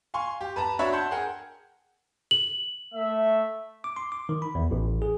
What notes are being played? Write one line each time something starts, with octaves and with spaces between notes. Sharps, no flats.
F5 G#5 C6 C#6
G4
B4 A5 A#5
D4 F#4 C#5 E5 F#5 B5
F#5 A5 C6 G6 G#6
G#4 A#4 F#5 G5
F#7
A3 E5
D6
C6
D6
D#3
B5
E2
A1
G#4